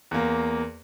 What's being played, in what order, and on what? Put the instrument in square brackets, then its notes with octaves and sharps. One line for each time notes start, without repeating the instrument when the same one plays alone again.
[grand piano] E2 A#3